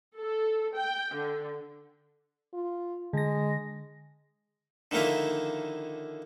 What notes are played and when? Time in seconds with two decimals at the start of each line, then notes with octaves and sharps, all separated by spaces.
0.17 A4
0.75 G5
1.15 D3
2.53 F4
3.13 D3 G#3 A#6
4.91 D3 D#3 F3 A#3 E4